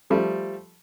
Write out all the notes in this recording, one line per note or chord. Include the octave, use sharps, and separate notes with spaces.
F3 G3 A3